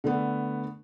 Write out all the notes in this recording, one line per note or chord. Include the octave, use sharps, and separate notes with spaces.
D3 A3 B3